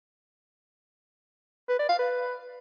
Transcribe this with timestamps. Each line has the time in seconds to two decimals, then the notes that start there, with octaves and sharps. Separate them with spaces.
1.69 B4
1.79 D5
1.89 F5
1.99 B4